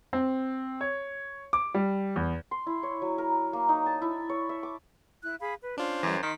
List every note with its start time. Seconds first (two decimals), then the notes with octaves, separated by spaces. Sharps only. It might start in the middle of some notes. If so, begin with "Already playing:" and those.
0.13 C4
0.81 C#5
1.53 D6
1.74 G3
2.16 E2
2.51 C6
2.67 E4
2.83 C#5
3.02 F#3
3.18 A#4
3.53 A#3
3.69 D#4
3.86 A5
4.02 E4
4.29 C#5
4.49 E5
4.63 D6
5.23 E4 F#6
5.40 G#4 F5 B5
5.61 B4
5.78 C#4 D4 F4 C5
6.03 F#2 E3 G3
6.23 D#3 D#5 C6 B6